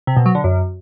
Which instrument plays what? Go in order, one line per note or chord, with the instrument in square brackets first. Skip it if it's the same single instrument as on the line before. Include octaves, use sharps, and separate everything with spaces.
[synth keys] C3
B2
F#3
D3
F#2